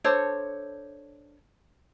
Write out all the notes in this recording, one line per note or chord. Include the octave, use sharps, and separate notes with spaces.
D4 A4 C5 C#5